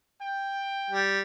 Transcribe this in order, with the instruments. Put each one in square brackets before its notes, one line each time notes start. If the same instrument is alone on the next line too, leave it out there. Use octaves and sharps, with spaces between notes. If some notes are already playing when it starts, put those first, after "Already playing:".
[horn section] G5
[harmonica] G3